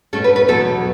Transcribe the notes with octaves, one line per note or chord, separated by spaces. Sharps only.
B2 A3 C#4 A4
B4
B4
E2 B2 F#3 A4